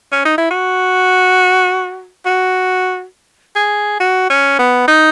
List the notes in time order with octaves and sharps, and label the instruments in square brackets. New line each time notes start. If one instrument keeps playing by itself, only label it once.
[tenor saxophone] C#4
D#4
E4
F#4
F#4
G#4
F#4
C#4
B3
D#4